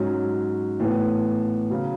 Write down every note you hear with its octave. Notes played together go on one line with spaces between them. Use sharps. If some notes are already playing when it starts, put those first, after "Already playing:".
Already playing: G#2 F#3 C#4
A2 E3 B3
C#3 F#3